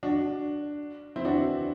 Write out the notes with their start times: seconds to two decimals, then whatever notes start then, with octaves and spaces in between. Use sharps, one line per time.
0.03 D4 F#4
1.16 C4 E4
1.25 D4 F#4